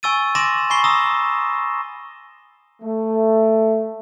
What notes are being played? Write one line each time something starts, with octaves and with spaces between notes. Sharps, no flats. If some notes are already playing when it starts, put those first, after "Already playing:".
G#5 C#6 E6 A6 D#7
G#5 C6 D6 A#6 E7
G#5 B5 C#6 C7 G7
A#5 D#6 E6 A#6
A3